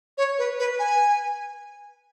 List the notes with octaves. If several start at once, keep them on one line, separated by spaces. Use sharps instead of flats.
C#5
B4
B4
G#5